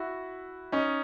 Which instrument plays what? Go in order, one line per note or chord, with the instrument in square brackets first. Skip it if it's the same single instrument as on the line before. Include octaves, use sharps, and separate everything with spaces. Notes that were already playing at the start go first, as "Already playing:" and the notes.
Already playing: [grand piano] E4 F#4
C#4 D#4